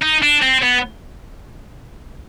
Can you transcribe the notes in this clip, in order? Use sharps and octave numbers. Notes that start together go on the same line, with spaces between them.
D#4
D4
C4
B3